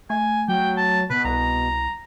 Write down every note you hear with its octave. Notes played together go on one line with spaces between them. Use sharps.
A3 G#5
F#3 G5
A5
B2 B4
C2 A#5